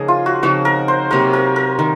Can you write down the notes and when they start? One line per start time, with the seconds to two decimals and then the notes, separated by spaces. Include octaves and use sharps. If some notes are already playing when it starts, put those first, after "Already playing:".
Already playing: C#3 F3 A#3 D#4 G#4 A#4
0.08 F4
0.26 F#4
0.43 C#3 F3 C4 D#4 F#4
0.65 A#4
0.88 C5
1.11 C3 F#3 A#3 A#4
1.33 A#4
1.56 A#4
1.79 D#3 A#4